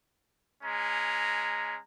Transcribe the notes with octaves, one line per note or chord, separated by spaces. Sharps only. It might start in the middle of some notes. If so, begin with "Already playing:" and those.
G#3 C#4 A#5